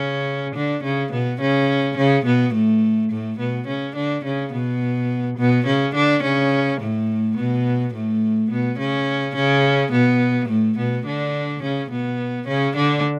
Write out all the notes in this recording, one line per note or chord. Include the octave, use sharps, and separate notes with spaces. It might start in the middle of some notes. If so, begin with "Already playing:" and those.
Already playing: C#3 C#4
D3 D4
C#3 C#4
B2 B3
C#3 C#4
C#3 C#4
B2 B3
A2 A3
A2 A3
B2 B3
C#3 C#4
D3 D4
C#3 C#4
B2 B3
B2 B3
C#3 C#4
D3 D4
C#3 C#4
A2 A3
B2 B3
A2 A3
B2 B3
C#3 C#4
C#3 C#4
B2 B3
A2 A3
B2 B3
D3 D4
C#3 C#4
B2 B3
C#3 C#4
D3 D4